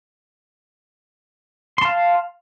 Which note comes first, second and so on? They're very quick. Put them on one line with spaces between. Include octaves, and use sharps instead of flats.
C6 A5 F5